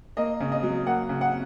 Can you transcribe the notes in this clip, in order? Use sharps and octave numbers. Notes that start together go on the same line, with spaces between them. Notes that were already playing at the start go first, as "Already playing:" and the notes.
A#3 D#5
C#3
D#5
F#3
A#3 F#5
C#3
F#5